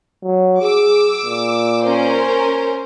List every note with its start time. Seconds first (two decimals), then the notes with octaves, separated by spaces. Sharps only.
0.23 F#3
0.61 G#4 D6 E6
1.26 A#2
1.84 C#4 A#4 C5